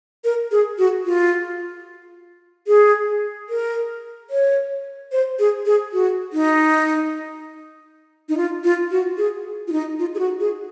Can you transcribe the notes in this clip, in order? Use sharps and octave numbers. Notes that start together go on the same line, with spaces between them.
A#4
G#4
F#4
F4
G#4
A#4
C#5
C5
G#4
G#4
F#4
D#4
D#4
F4
F4
F#4
G#4
F4
D#4
F4
G#4
F#4
G#4